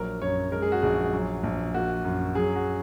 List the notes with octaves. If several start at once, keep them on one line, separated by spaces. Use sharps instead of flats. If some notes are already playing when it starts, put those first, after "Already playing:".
Already playing: A#1 F#3 A#4
F#2 C#5
G#3 A#4
G#4
F#4
A#1 G#4
F#3
A#1
A#3 F#4
F#2
F#3 G#4
F#4